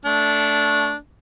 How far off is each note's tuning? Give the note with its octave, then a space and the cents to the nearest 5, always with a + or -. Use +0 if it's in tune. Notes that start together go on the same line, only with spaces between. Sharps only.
A3 +0 D4 -15